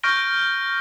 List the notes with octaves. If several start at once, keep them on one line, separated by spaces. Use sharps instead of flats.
C#6 F6 G6 A#6 D7 G7